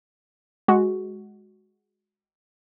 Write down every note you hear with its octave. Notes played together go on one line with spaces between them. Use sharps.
G#3 F#4